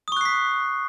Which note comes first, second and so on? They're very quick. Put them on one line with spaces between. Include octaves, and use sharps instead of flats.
D#6 C#6 F#6 C7 B6